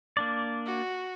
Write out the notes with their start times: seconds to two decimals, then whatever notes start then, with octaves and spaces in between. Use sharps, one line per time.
0.17 A#3 D4 D5
0.66 F#4